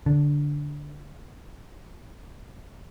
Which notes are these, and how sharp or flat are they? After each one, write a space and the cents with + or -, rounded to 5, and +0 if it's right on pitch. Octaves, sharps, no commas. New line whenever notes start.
D3 -10